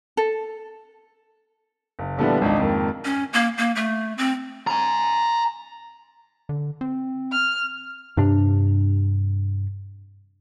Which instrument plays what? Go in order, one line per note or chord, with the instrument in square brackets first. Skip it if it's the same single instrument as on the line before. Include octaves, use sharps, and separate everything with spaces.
[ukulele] A4
[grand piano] F#1
A#2 D3 F3 G3 B3 E4
G#1 C#2 D4 D#4
F2 G#2 D#3 A#3
[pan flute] C#4
A#3
A#3
A3
C4
[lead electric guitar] G#5 A#5
[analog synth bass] D3
C4
[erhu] F6
[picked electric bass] G2 C3 D4